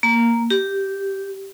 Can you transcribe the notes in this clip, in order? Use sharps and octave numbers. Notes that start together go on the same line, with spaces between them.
A#3
G4